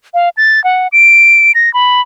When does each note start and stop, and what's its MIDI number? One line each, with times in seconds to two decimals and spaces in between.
0.14 0.29 77
0.37 0.63 93
0.64 0.88 78
0.92 1.52 98
1.55 1.72 94
1.74 2.01 83